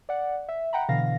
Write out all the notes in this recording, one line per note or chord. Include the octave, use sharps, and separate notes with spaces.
D5 F#5
E5
F#5 G5 A#5 B5
B2 D3 E3 F5 A#6